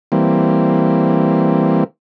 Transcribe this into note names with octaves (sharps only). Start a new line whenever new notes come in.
E3 G3 A#3 C4